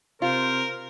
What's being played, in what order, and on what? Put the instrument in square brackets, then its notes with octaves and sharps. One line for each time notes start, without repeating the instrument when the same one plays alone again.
[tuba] C3 [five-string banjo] F4 [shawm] A#4 [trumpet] C5